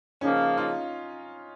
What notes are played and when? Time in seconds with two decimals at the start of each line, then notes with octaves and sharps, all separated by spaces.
0.21 C#3 F3 A#3 C#4 D#4
0.57 D#4 F4